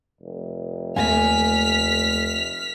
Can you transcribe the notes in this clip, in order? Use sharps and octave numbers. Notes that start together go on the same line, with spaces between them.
F1
D#2 A3 E5 G#5 F6 B6